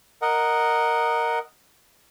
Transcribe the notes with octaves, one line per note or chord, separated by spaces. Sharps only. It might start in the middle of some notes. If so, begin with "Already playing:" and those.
A#4 D#5 F#5